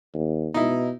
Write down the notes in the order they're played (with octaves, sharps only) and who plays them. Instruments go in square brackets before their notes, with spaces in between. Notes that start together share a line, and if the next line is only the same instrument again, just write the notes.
[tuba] D#2
[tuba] B2 [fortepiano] D#4 E4